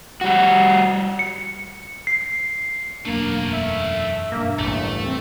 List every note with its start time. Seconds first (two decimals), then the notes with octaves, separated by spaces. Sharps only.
0.21 G3 F#4
1.19 C#7
2.07 C7
3.05 E1 F#2 A3 A#3 D4 F5
3.52 E5
4.32 E1 G2 A#3 D4
4.59 A1 A3
5.04 C4